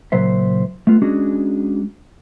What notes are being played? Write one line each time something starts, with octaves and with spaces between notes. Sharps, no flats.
C#2 A#2 F#3 C5 E5
A3 B3 F4
G#3 C#4 D4 F#4 G#4